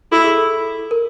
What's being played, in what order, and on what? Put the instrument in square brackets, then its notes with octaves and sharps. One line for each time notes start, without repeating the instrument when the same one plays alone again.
[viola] E4 [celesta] A4
[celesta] G#4
A4
A#4